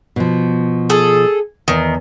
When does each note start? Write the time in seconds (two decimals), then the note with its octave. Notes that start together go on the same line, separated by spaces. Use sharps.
0.16 B2 F3
0.90 G#4 A4
1.68 E2 D#3